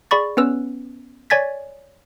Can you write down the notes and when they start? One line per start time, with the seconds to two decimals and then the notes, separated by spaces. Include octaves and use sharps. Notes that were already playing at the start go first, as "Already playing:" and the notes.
0.11 G#4 D5 B5 C#6 A6
0.37 B3 C#4 B4 E6
1.30 C#5 D5 G#5 G#6 A6 B6